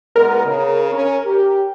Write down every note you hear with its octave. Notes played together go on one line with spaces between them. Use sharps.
A#2 G#3 B3 A#4
C#3
C#4
G4